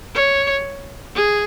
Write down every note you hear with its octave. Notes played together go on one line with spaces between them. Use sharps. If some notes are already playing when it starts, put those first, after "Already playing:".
C#5
G#4